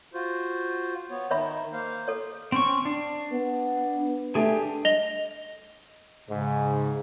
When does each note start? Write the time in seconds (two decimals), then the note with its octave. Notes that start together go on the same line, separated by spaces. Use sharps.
0.14 F4 F#4 C5
1.10 B3 C#5
1.31 D#3 C#5 E5 B5
1.73 A#3 C5 F5
2.08 A4 C#5
2.52 C4 C#4 C#6
2.85 D4
3.32 B3
4.35 A3 D4 G4 G#4
4.85 D#5 A#6 F7 G7
6.29 G#2 C#3